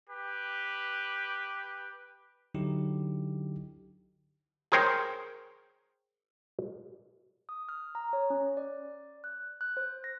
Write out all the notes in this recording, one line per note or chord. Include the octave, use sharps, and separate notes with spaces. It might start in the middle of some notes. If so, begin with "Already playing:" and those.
G4 B4
D3 F#3 D#4 E4 G4
G#4 A#4 C5 C#5 G5
D#6
F6
A#5
C#5
C#4
D5
F#6
F#6
C5
A#6